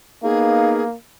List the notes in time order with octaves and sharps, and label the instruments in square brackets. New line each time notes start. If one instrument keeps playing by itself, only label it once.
[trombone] A#3 [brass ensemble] B3 D#4 [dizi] G#4 [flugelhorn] F5